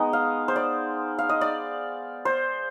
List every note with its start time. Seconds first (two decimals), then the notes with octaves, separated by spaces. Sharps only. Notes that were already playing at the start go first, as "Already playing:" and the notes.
Already playing: G#3 B3 D#4 D#5
0.13 F5
0.48 C5
0.56 D5
1.19 F5
1.29 D#5
1.41 D5
2.25 C5